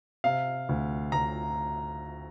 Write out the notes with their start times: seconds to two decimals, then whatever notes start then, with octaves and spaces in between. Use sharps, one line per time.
0.24 C3 F5
0.69 D2
1.12 D2 A#5